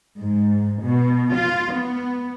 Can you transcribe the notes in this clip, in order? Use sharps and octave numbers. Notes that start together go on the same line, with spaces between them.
G#2
B2
F4
B3